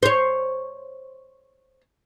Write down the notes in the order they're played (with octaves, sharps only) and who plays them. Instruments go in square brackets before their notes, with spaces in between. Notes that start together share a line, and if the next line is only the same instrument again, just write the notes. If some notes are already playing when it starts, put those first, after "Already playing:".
[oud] C5 C#5